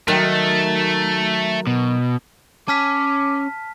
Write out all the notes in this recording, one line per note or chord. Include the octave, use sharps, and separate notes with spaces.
D#3 F#3 A3
B2
C#4 A5 D6 F6 B6